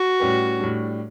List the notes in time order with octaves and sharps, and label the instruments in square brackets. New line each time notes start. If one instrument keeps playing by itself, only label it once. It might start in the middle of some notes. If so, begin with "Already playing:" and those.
Already playing: [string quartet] F#4
[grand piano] A2 G3 C#4 G4 B4
A2 G3 D4